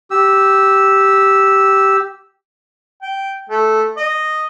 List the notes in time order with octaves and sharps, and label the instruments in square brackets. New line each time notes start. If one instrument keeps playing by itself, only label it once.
[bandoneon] G4 E6
[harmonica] G5
A3
D#5